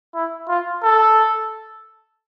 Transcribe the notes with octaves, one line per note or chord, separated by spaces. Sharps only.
E4
F4
A4